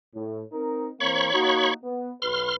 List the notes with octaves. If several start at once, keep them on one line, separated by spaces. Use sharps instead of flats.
A2
C4 D#4 A#4
E3 A#3 C4 C#5 B5 C#6
A#3 D#4 F#4
B3
B1 B4 C6 F6